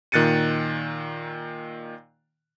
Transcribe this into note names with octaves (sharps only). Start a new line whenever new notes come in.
A#2 D#3 F#6 A6 C#7 D#7